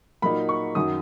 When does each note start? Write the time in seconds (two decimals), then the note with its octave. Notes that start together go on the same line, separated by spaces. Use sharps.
0.22 A#2 F#3 A#3 D#4 B5
0.49 C#6
0.75 F#2 D#3 F#3 D#6